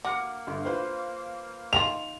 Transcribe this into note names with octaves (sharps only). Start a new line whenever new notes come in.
A#3 F#4 D6 F6 C#7
G1
F4 B4 C5
D#3 D#4 F4 F7